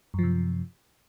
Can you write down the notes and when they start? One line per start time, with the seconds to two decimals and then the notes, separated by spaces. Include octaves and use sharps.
0.14 F#2
0.19 F3
0.23 C3